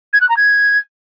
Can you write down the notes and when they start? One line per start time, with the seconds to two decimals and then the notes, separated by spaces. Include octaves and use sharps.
0.13 G#6
0.21 F#6
0.29 A#5
0.37 G#6